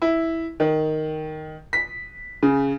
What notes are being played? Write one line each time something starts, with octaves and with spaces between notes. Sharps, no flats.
E4
D#3
B6
C#3